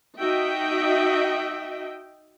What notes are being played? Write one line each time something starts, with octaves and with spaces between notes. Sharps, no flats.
D#4 F#4 D#5 E5 G5